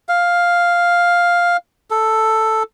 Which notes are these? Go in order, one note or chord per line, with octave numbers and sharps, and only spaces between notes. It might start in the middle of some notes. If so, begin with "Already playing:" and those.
F5
A4